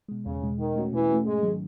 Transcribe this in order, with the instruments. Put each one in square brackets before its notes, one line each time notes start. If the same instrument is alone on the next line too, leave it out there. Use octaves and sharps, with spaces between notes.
[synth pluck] B2 G#3
[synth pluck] E2 [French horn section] C#3
[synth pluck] B2 G#3
[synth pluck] B2 [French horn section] D#3
[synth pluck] A3 C#4 F#4
[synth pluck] B2 [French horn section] E3
[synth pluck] A3 C#4 F#4
[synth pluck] G#2 [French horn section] G#3
[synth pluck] D#3 F#3